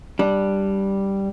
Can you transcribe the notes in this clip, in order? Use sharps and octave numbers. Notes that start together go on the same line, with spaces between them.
G3 D4